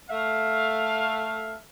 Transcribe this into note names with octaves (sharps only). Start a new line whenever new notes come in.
A3 E5 F5